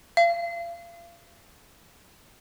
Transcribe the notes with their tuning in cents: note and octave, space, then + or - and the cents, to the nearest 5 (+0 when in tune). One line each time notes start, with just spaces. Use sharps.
F5 -35